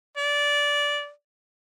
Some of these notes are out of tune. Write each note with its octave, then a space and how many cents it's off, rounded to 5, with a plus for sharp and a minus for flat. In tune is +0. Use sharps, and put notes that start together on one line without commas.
D5 -15